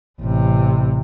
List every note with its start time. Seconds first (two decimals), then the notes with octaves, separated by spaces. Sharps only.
0.21 A1 C3